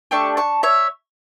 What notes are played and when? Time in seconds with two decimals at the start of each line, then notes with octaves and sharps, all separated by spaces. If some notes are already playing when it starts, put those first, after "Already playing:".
0.11 A3 D4 G4 A5 C#6
0.37 A5 C#6
0.63 C#5 E5